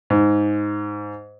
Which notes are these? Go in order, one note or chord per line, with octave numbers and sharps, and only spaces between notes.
G#2